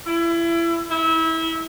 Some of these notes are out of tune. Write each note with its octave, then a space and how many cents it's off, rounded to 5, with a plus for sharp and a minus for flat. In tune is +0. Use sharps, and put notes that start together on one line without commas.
E4 +30
E4 -25